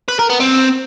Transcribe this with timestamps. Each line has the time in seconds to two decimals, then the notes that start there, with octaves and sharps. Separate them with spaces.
0.08 B4
0.19 A#4
0.30 B3
0.40 C4